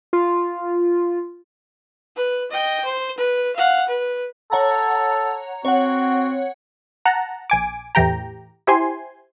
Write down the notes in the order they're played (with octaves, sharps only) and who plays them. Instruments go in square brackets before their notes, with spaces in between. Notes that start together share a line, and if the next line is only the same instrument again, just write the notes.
[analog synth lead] F4
[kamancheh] B4
D#5 G5
C5
B4
F5 F#5
B4
[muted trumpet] A4 [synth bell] C#5 F#5 A#5
[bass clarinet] C4 [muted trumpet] F#4 [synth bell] C#5 F#5
[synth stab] F#5 A5 A#5
A#1 G#5 D6
E2 A2 E3 G4 G5 A#5
E4 G4 C5 G#5 C6